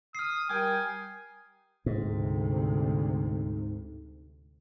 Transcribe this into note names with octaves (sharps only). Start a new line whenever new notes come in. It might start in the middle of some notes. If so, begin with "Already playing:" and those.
D#6 F6 C7
G3 A#4 G5 G#5 D#6
D2 G#2 C3